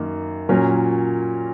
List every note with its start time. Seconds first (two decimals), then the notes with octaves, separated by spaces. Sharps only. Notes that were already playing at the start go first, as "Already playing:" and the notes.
Already playing: F#2 D#3 A#3
0.49 A#2 F#3 C#4 A#4